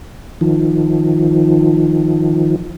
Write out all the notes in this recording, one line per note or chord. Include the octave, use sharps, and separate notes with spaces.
D#3 F3